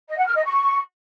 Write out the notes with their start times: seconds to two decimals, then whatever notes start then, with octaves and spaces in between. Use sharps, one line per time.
0.08 D#5
0.17 F#5
0.27 F6
0.36 D#5
0.45 C#6